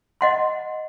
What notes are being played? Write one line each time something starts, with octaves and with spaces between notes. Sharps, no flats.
D#5 F#5 C6